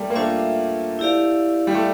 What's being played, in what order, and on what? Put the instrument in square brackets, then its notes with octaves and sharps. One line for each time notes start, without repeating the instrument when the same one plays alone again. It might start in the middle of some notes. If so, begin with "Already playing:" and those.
Already playing: [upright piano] G3 A3 A#3
A#3
[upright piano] A3 [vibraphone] D4 F4 C5 E5
[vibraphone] E4 G4 D5 F5
[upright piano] G3
A3